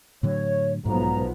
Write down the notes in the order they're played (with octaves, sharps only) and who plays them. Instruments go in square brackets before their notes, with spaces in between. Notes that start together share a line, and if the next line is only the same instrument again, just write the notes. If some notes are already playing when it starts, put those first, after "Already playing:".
[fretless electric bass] A2 D3 F#3 [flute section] C#5
[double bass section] B1 F3 B3 [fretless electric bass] G#2 [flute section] A#5